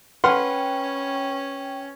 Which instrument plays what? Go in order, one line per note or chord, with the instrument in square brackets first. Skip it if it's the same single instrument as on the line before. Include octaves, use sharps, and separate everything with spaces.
[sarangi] C#4 [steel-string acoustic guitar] B4 [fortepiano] F#5 C6 F6 [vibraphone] G5